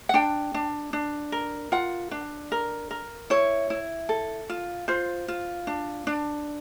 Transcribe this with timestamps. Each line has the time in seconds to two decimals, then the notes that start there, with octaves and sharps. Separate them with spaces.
0.09 F#5
0.14 D4 G5
0.54 D4
0.93 D4
1.32 A#4
1.72 F4 F#5
2.11 D4
2.52 A#4
2.91 A#4
3.30 E4 C#5
3.70 E4
4.09 A4
4.50 F4
4.88 F4 C5
5.28 F4
5.67 D4
6.07 D4